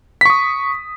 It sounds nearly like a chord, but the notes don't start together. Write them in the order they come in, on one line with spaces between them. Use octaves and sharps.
B6 C#6 D#6